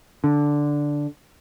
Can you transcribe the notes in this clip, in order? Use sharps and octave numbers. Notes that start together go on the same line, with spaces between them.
D3